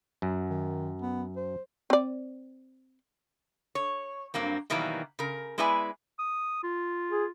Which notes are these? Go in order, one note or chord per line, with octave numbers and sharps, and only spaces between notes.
F#2
D#3
B3
C5
C4 D5
C#5
G2 F#3 A#3 C4
B2 D#3 E3 F#3 G3 A#3
C#3 A#4
G#3 B3 E4 B4 D5 G#5
D#6
F4
G#4